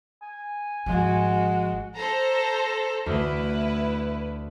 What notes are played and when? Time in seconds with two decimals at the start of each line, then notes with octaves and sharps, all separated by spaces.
0.22 G#5
0.86 G#1 F3 G#3 F#4
1.95 A4 C5 A#5
3.06 D2 E4 B4